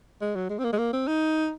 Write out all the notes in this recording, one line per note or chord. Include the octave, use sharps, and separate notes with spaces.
G#3
F#3
G#3
C4
A#3
G#3
A#3
C4
D#4